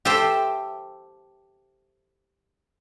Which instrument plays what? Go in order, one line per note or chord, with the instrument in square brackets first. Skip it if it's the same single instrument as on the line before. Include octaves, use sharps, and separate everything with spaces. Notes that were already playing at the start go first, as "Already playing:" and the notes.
[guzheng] G4 A4 C5 E5 G5